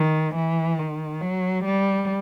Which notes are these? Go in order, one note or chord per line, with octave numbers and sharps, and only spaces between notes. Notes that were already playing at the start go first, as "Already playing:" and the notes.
Already playing: D#3
E3
D#3
F#3
G3